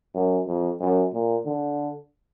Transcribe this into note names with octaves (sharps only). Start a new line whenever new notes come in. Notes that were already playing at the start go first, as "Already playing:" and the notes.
F#2
F2
F#2
A#2
D3